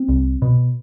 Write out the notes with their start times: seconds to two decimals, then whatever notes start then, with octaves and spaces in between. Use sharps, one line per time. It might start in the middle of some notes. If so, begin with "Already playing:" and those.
Already playing: C4
0.08 C2
0.42 B2